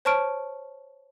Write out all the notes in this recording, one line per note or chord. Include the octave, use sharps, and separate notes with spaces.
C5 C#5 A5 C#6 F6 D7